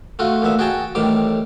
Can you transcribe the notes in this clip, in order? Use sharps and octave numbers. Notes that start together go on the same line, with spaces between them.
A3 F4 F#4
D2 A#2 B3 E5
F#4 G#4 G5 A5 A#5
A1 A2 D#3 G3 D6